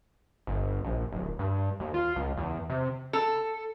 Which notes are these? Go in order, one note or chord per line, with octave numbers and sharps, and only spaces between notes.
G1
A#1
D1
G2
D#2
F4
C#2
E2
C3
A4